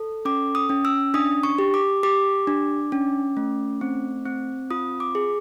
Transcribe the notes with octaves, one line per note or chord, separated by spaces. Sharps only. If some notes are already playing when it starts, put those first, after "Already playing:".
Already playing: A4
C#4 D6
D#6
C#4
E6
D4 D#6
C#6
G4
D6
G4 D6
D4
C#4
A3
C4
C4
F4 D#6
D6
G#4